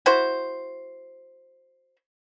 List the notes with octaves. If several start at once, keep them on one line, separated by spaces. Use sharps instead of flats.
E4 F#4 C5